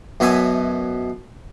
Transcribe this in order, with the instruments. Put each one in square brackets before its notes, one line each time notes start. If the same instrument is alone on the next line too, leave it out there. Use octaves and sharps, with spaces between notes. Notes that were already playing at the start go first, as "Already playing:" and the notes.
[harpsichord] F#2 B2 E5 G#5